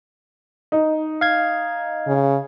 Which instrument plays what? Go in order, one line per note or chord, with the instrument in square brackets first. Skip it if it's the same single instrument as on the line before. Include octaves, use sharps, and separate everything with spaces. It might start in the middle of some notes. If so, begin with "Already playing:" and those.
[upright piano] D#4
[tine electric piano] F5 G#6
[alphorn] C#3